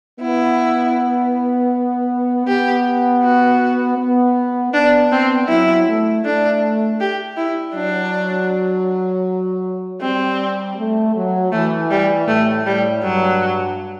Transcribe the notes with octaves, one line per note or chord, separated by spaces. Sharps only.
B3 E4
B3 G4
F#4
B3
B3 D4
C4
F#3 E4
A3
A3 D4
G4
E4
F#3 D4
G3 C4
A3
F#3
E3 A3
G3
A2 A3
A2 G3
G2 F#3